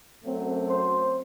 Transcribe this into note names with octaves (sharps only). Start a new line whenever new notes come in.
F#2 F#3 A3 C4
C5